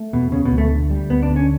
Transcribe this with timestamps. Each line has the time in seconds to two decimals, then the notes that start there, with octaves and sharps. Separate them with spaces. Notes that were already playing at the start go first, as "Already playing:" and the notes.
Already playing: A3
0.13 E2 B2
0.32 D2 C#3
0.45 B2
0.51 D2
0.58 A3
0.71 D3
0.90 G3
1.10 D2 B3
1.23 D4
1.30 D3
1.36 C#4